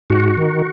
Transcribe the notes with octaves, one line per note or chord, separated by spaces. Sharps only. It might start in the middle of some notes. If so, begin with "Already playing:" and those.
G#2 F#4
D#3